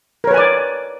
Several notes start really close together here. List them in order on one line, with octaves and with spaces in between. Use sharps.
A#4 C#5 B4 G#5 D5